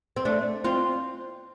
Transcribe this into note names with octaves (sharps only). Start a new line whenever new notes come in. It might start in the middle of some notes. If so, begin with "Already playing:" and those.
C4
A3 D4
C4 F4